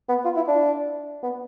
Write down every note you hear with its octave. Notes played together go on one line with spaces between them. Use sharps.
B3
F4
E4
D4
B3